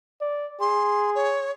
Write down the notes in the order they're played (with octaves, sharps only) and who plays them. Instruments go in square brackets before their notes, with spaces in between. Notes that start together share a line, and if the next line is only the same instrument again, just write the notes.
[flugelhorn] D5
[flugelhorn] G#4 [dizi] C6
[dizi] C#5